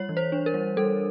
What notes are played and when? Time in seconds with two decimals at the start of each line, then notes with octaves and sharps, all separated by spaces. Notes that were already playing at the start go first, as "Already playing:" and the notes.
Already playing: G3 C#5
0.09 E3
0.17 C5
0.32 D4
0.46 A#4
0.54 G3
0.77 G3 A4